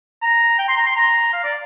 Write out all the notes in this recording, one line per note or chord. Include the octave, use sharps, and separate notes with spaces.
A#5
G5
C6
A#5
C6
A#5
F5
D5